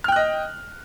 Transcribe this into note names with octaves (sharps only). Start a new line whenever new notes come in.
D#5 G5 F6 F#6